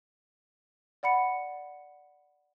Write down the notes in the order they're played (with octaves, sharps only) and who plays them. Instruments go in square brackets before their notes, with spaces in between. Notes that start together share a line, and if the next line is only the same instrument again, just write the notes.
[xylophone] D5 F#5 B5 C#7